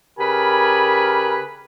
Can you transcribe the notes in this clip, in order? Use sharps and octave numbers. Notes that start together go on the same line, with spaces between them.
C#3 G4 A#4 B4 G#5 B5